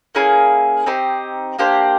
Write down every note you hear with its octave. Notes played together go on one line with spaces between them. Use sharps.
A#3 C#4 E4 G#4
C4 D#4 G4 C5
A#3 D4 G4 C5